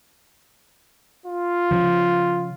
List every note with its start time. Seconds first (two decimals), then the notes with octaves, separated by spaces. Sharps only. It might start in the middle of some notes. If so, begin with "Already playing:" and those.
1.26 F4
1.71 C#3 F3